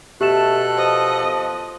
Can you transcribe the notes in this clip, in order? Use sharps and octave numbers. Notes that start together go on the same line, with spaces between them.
B2 A3 G4 A4 F#6 E7
F3 D#5